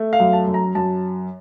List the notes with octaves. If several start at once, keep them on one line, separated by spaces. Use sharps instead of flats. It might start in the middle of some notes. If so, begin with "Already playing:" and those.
Already playing: A3
F5
F#2
A5
F#2
A#5
F#2 A5